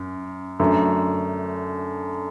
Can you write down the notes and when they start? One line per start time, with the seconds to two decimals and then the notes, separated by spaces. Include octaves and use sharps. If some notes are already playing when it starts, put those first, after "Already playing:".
Already playing: F#2
0.60 F#2 D3 A3